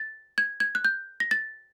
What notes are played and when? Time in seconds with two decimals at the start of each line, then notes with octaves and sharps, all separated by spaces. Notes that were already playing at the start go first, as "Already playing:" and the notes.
Already playing: A6
0.38 G#6
0.60 G#6
0.75 F#6
0.85 G6
1.20 A#6
1.31 A6